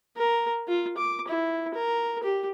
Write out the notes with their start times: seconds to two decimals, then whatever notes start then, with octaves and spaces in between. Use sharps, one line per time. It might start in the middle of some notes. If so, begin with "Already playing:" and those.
0.16 A#4
0.68 F4
0.97 D6
1.28 E4
1.74 A#4
2.23 G4